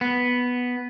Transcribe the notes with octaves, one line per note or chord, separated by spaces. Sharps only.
B3